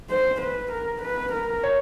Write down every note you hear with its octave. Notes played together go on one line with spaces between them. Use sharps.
C5
B4
A#4
B4
A#4
C#5